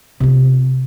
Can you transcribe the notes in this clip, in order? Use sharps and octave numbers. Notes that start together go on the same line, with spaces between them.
C3 F4